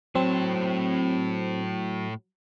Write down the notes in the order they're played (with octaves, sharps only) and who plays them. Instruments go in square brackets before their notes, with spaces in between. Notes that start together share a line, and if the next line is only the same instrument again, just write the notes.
[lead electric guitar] A2 A5 [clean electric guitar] F#3 [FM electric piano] C4